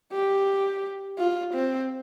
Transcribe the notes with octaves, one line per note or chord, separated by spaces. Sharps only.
G4
F4
C4